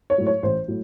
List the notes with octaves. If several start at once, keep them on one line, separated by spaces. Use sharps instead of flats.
C#5
A2 F#3
C#5
A1 C5
A2 F#3